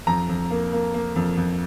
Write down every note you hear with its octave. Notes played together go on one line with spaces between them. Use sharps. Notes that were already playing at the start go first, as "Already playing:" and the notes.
F2 A#5
F2
A#3
A#3
A#3
F2
F2